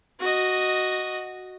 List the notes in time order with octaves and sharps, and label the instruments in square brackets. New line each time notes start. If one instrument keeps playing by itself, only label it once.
[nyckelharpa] F#4 D#5